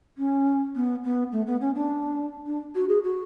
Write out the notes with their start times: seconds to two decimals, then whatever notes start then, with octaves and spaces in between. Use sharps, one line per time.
0.18 C#4
0.75 B3
1.03 B3
1.32 A3
1.46 B3
1.61 C#4
1.75 D4
2.46 D4
2.75 F#4
2.88 G#4
3.04 F#4